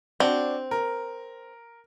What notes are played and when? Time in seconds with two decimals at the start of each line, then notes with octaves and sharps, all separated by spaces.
0.20 C4 D4 F#4
0.71 A#4